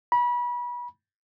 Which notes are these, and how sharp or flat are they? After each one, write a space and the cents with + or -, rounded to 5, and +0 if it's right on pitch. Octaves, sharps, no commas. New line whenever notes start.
B5 -30